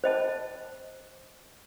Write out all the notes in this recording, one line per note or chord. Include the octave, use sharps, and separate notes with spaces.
C5 D#5 A5